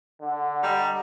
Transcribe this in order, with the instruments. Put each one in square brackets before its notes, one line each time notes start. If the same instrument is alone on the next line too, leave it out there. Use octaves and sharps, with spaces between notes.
[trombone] D3 [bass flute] F#5
[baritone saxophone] G3 [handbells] D#5 A#5